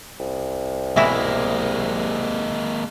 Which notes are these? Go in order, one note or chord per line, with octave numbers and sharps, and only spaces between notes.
C2
B2 E3 G#3 A#3 E4 E5